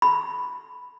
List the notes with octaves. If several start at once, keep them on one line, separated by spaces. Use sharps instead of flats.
B5